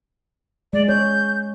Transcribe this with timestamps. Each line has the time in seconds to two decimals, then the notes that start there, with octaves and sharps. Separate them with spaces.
0.73 G#3 D5
0.89 C#5 G6